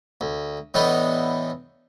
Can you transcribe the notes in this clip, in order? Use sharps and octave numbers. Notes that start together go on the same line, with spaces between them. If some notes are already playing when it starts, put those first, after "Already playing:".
D2
A2 E3 B3 D4 D#4